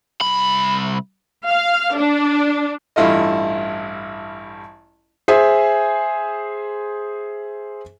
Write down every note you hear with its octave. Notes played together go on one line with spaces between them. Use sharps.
C2 B5
F5
D4
A1 G2 E4 F4 A4 D#5
G#4 C5 E5 G#5